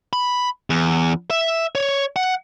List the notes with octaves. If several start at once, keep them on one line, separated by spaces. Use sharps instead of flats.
B5
E2
E5
C#5
F#5